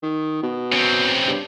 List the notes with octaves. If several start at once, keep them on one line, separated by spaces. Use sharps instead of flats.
D#3
B2
C#3 C4
G2